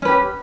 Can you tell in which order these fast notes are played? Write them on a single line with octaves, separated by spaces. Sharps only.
C#4 B4 G4